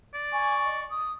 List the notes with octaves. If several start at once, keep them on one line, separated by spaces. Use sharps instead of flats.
D5
G#5 C#6
D#5
D#6